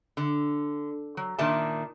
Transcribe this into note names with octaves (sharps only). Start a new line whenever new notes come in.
D3
F#3
A#2 D#3 D4 E5 A5